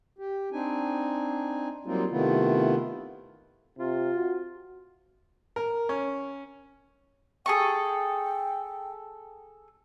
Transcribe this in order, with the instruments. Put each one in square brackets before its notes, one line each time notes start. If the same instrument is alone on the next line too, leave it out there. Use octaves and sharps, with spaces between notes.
[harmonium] G4
C4 D4 D#4 G#5
F#3 G3 A#3 C4 D#4 F4
C3 D#3 A3 B3 E4 F4
[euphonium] C3 [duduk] F4
[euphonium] F#4
[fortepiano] A#4
C#4
[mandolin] G#4 A4 C#6 [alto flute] G5